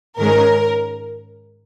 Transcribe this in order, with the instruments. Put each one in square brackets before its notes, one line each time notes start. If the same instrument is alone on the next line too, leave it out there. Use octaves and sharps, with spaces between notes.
[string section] G#2 D#3 G#3 C#4 A#4